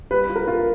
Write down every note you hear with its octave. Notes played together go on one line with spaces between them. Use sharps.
G3 B4
F4
A#4
F4